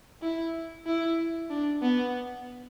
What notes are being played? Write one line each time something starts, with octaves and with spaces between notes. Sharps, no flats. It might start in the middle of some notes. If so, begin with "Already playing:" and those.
E4
E4
D4
B3